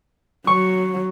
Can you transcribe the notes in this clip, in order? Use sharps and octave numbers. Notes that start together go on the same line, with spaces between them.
F#3 C#6